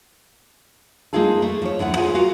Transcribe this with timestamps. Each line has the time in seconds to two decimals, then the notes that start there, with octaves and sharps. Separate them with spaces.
1.13 G#3 A#3 D#4 F4 G#4 A4
1.42 A3
1.62 F3 C#5
1.79 D2 D3 E4 F#5
1.97 F4 G#4 G#5
2.14 F4 F#4 A#4 F5